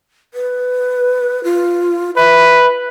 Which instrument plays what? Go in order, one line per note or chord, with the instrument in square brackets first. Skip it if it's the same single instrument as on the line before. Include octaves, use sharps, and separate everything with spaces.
[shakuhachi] B4
F4
[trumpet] B4 [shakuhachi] E5